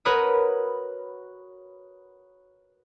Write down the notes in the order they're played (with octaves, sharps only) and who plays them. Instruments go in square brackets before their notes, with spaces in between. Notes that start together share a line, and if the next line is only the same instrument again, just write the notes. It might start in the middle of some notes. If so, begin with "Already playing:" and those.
[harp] F#4 A#4 B4 C#5 B5 D#6